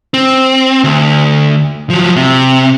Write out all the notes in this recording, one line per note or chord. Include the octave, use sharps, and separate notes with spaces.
C4
D2
F3 F#3
C3